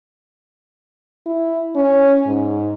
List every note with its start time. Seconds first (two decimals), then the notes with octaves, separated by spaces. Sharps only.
1.26 E4
1.76 C#4
2.27 G#2